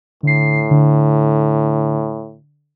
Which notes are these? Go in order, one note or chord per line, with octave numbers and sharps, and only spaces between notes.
A2 D3 C7
D3